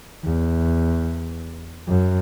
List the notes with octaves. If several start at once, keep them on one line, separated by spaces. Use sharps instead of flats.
E2
F#2